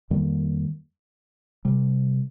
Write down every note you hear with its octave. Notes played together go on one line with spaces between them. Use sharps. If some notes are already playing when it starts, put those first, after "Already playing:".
F2 D#3 G3 A#3
C3 G3